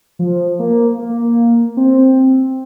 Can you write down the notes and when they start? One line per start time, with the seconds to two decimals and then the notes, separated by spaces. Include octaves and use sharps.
0.19 F3
0.59 A#3
0.99 A#3
1.77 C4